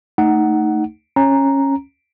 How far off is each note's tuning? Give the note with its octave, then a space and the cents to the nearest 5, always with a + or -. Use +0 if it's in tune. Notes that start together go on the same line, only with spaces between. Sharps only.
A3 +15 D#4 +0 F#5 +10
C#4 -15 A#5 +0